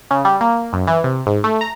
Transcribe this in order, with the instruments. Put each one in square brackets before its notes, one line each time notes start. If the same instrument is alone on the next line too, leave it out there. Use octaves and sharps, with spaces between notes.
[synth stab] C#3
G3
A#3
F#2
E3
C3
G#2
A3
A#5